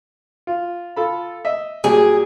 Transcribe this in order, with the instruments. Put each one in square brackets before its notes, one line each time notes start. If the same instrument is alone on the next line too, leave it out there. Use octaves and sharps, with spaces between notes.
[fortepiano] F4
F4 A4 B5
D#5 E5
[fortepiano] A#2 F#3 G3 [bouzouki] G#4